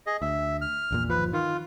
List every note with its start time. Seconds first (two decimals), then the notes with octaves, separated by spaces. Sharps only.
0.07 G#4 D#5
0.22 D2 E5
0.61 F6
0.91 A#1 E2 A#2
1.10 G1 D#2 F3 B4
1.33 D#3 F4